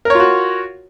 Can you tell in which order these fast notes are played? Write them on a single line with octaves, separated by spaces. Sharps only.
A#4 C#5 F4 F#4